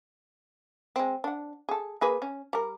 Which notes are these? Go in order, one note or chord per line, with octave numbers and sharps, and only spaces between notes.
G#3 C4
D4 F#5
G#4 A4
A#3 G#4 B4
C#4
G3 A#4